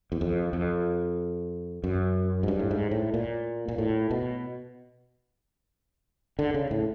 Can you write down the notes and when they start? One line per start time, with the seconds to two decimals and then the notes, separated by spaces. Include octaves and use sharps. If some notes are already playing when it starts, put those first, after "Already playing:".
0.12 E2
0.21 F2
0.53 F2
1.84 F#2
2.43 G#2
2.48 G2
2.59 A2
2.71 G#2
2.91 A2
3.14 A#2
3.68 A#2
3.78 A2
4.11 B2
6.39 D3
6.54 C#3
6.71 A2